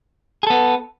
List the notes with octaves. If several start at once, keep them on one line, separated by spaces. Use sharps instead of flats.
B3 G#4 A4